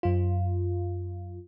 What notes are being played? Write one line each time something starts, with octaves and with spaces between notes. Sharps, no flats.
F#2 F4